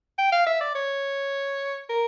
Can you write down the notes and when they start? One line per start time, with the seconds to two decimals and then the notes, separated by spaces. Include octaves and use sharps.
0.18 G5
0.32 F5
0.46 E5
0.61 D5
0.75 C#5
1.89 A#4